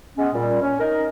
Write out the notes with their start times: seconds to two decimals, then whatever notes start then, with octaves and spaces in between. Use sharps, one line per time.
0.17 G#3 B3 C#4
0.33 A#2 G3
0.61 C#4
0.79 D#4 A#4